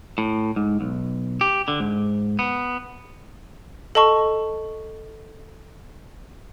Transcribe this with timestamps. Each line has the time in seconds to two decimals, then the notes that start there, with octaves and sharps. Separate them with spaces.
0.18 A2
0.56 G#2
0.81 B1
1.41 G4
1.68 D3
1.80 G#2
2.39 B3
3.95 A4 D#5 A5 C#6